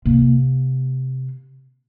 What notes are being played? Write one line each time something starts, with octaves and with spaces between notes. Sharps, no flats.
C3 A#3